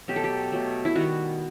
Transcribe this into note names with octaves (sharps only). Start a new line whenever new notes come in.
B2 F#3 A3 G4
A4
G4
B2 F#3 A3
E4
D#3 G3 B3 F#4